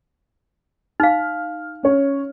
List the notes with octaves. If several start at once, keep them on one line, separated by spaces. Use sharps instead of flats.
D#4 F5 F6
C#4 C#5